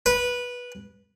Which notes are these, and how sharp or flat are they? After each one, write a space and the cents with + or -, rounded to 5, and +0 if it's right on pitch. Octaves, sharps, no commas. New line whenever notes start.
B4 -15